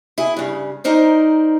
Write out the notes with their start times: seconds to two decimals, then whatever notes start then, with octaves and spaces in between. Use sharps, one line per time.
0.18 E4 G#4
0.37 G2 C#3
0.84 D#4 A#4 C5 D5